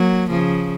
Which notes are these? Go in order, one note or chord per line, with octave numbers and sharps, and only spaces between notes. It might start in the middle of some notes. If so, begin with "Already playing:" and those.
Already playing: F#3 A#3
C#3 F3